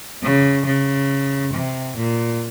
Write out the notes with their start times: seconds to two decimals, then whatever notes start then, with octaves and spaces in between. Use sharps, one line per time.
0.22 C#3
0.65 C#3
1.53 C3
1.97 A#2